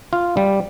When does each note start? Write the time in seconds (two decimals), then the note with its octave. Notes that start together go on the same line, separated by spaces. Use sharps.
0.13 F4
0.37 G3